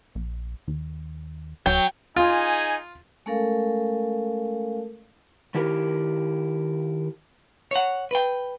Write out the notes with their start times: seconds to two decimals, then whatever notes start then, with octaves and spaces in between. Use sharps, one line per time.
0.15 A#1
0.68 D#2
1.66 D#1 F#3 G5
2.16 D#4 F4 G#4 G#5
3.26 G#3 A3 C#4 A4 A#4 F5
5.55 D#3 E4 G4 A#4
7.71 C#5 F#5
8.11 B4 G5